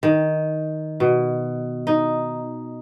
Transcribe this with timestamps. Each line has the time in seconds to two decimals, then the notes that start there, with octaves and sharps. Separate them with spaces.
0.03 D#3
1.00 B2
1.87 D#4